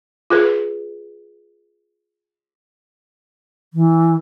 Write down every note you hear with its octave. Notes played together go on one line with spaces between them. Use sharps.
F4 G#4 B4
E3